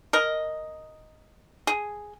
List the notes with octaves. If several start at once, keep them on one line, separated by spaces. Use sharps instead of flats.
A#4 D#5
G#4